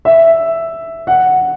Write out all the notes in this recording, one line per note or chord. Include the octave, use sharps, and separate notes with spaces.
E5
F#5